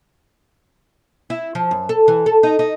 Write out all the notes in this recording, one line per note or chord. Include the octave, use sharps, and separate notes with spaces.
E4
F3
F#2
A4
E3
A4
D#4
D#4